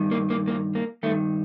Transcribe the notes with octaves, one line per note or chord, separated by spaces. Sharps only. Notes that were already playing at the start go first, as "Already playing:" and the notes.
Already playing: G2 D#3
A#3
A#3
A#3
A#3
G2 D#3 A3